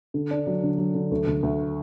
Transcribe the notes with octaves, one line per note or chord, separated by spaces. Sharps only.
D3
D4
F#3
D3
F#3
D3
D2
D2
D2